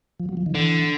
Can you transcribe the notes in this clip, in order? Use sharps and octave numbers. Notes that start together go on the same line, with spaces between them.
F3
F#3
F3
D#3
D3 E3